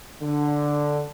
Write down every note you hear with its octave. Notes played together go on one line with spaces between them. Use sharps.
D3